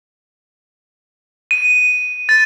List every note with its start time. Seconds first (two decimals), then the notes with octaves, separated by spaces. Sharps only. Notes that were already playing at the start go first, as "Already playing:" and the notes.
1.51 D#7
2.29 A6